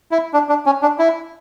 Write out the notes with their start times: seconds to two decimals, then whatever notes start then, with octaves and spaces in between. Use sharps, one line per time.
0.11 E4
0.33 D4
0.49 D4
0.66 C#4
0.82 D4
0.99 E4